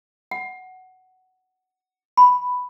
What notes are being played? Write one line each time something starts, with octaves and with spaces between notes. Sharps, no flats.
F#5
B5